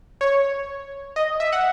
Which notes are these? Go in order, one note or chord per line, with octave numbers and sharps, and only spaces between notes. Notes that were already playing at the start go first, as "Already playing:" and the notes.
C#5
D#5
E5
F#5